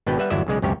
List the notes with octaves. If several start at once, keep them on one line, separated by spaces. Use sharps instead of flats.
G#1 B2 B3 D4 B4 G5
G3 B4 E5 F#5
G1 E2 F#3 E4 D5 E5
B1 C#3 G#3 D5
C#2 F#2 C3 C#4 G4 C#5